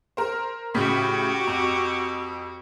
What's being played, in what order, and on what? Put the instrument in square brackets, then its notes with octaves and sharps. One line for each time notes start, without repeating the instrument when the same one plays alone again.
[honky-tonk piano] A#4 C5
[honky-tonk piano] A2 C#3 B6 [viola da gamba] F#4 G4
[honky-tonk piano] F2